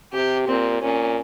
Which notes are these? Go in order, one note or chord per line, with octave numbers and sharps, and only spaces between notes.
C3 G4
A#2 C4
A#2 C#4